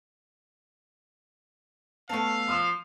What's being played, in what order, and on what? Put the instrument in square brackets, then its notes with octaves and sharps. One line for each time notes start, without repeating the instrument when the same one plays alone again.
[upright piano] A3 B3 [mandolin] C#4 A4 [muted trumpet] F5
[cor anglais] F3 [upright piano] C6 D#6 F6